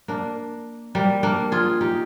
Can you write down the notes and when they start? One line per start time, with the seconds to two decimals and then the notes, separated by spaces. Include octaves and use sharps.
0.08 A#3 D4
0.95 G3 A#3
1.23 A#3 D4
1.52 F4 G#4
1.81 D#4 G4